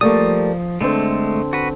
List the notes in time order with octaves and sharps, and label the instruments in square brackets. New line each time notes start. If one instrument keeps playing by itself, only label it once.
[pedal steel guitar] F3 D#6 [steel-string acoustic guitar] G3 A3 A#3
[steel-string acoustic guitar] D3 C4 C5 [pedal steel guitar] G#3 A3
[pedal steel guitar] F#4 B4